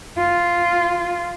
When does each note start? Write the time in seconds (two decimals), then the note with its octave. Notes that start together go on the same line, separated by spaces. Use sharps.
0.18 F4